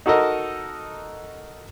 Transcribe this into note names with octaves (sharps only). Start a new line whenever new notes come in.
D#4 F#4 A4 A#4 D#5